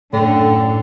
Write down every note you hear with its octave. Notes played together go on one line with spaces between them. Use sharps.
F#2 A2 D3 D4 A4 G5